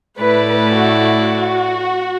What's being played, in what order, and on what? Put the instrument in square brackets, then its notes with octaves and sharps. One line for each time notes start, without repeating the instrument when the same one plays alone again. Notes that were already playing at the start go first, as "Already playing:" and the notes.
[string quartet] A2 A3 E4 D5 [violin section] B4
[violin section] B4
F#4